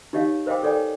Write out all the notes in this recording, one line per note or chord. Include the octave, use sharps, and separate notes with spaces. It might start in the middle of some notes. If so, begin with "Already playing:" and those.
D#4 G4 C#5 D#5 F5
A#4 C5 D#5 F5 G5 D6
A4 C#5 D5 G5 G#5